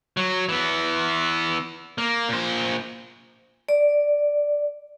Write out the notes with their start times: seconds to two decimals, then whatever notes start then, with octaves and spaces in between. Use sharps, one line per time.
0.17 F#3
0.49 E3 B3
1.98 A#3
2.29 A#2 C5
3.69 D5